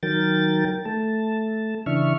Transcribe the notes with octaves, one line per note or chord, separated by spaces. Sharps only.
D#3 F#3 A#4 G5 A6
A3 A5
C#3 E3 D4 E5 C#6 F6